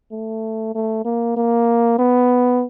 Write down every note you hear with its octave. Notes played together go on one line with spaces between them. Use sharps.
A3
A3
A#3
A#3
B3